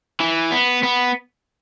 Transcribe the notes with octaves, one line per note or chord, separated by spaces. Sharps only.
E3
B3
B3